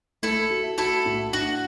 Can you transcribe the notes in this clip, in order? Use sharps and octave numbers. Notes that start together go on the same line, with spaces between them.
A3 E4 A4
F#4
E4 F#4 A4
A2
D4 F#4